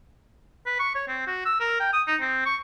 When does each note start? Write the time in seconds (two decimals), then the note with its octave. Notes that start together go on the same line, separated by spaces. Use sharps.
0.66 B4
0.79 C#6
0.95 C#5
1.08 C4
1.27 F#4
1.46 E6
1.60 A#4
1.80 G5
1.93 D#6
2.08 D#4
2.21 C4
2.46 C#6